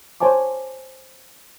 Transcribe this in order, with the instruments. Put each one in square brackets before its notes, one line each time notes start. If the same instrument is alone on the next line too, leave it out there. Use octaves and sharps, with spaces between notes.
[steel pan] C5 C#5 G#5 A5 D6